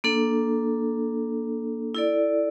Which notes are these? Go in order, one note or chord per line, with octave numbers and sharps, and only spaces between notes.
A#3 D4 A4
E4 A4 D5